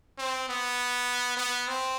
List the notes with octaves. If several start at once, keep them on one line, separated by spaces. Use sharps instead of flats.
C4
B3
B3
C4